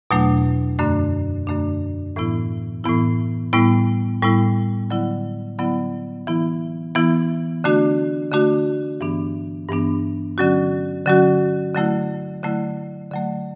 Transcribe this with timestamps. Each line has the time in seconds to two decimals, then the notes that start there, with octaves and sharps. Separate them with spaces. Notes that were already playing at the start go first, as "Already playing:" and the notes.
0.11 E2 B2 F#3 A3 D4
0.79 F#2 D3 A3 D4
1.47 F#2 D3 A3 D4
2.16 A2 E3 B3 E4
2.84 A2 E3 B3 E4
3.53 A2 G3 B3 E4
4.22 A2 G3 B3 E4
4.90 D3 F#3 B3 E4
5.59 D3 F#3 B3 E4
6.27 E3 B3 E4
6.95 E3 B3 E4
7.64 D3 A3 D4 F#4
8.32 D3 A3 D4 F#4
9.00 G2 E3 B3 D4
9.69 G2 E3 B3 D4
10.38 D3 F#3 C#4 F#4
11.06 D3 F#3 C#4 F#4
11.75 D3 F#3 A3 E4
12.43 D3 F#3 A3 E4
13.11 D3 F#3 A3